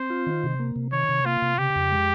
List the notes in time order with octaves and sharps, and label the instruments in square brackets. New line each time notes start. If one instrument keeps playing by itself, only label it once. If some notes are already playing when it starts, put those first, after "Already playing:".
Already playing: [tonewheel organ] C4 [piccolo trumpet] C5
[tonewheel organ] F4
D#3
C3
A#3
C3
[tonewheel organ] D#3 [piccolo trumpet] C#5
[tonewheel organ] C3
[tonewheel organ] A#3 [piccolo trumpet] F4
[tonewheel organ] C3
[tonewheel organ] C#3 [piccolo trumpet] G4
[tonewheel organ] F2
G#3